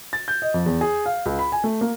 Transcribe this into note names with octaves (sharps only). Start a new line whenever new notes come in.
A6
G6
D#5
F2
E2
G#4
F5
C#2
B5
G#5
A3
A#3